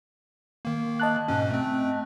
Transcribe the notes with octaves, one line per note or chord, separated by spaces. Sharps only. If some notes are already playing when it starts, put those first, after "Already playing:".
D#3 A#3
D#5 A5 F#6
G#2 B2 C#4
A3 C4